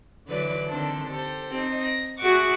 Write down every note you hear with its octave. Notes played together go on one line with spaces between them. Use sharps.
D3 E3 F#3 B4 D5
D3 D#3 C4 D4 A4 C5
G4 A4 C5
C4 D#4
A#6
F#4 G#4 E5 F#5 C#6 D6